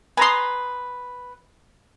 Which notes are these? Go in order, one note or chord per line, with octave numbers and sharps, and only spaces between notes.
B4 G#5 A#5 C6 D#6